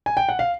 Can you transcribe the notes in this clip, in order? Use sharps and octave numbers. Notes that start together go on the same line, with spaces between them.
G#5
G5
F#5
F5